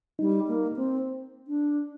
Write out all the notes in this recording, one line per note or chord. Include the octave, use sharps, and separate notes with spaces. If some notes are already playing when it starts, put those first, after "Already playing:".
G3 D#4
A#3
C4
D4